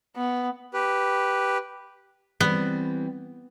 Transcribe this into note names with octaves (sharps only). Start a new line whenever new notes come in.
B3
G4 B4
E3 G3 B3 C4